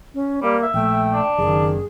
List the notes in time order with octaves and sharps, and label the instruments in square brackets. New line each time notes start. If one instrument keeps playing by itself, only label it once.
[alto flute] C#4
[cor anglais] G3 [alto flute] A#3
[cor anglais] E5
[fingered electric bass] A#1 [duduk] A3 [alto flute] G5
[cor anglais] D4
[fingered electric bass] F#1 F#2 [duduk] D#3 [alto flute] G#4